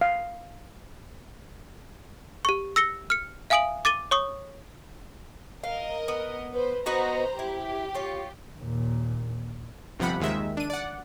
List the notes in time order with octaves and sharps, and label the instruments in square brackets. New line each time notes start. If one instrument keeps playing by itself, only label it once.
[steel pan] F5
[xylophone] G4 C#6
E6 A#6 C#7 G7
F6 C#7
E5 F5 G#5 D#6 D7 F#7
D6 A6 D#7 G7
C#5 C#6 D#6
[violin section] A#4 D#5 [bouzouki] F5
[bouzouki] B3
[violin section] B4 C5
[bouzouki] B3 D#4 F#4 [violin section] B4 C5 A#5
[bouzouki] E4 [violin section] G4
[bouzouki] F4 C#5
[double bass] D#2 A#2
[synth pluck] G1 C3 F3 F#5 B5
D#2 D#3 G#3 E5
D4 D#7
D5 F#5